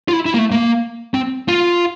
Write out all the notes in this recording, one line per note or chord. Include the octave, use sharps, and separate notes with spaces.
F4
E4
E4
A#3
A3
A#3
C4
F4